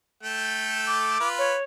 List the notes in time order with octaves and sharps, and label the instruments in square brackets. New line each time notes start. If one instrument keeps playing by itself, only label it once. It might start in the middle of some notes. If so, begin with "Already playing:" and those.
[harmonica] A3 A4 G5
[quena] D6
[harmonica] F4 B4
[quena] C#5